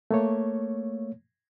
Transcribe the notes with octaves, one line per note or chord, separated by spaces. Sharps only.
A3 A#3 C#5